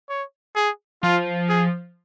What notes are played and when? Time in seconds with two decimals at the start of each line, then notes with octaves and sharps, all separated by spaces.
0.09 C#5
0.56 G#4
1.03 F3 F4
1.49 G#4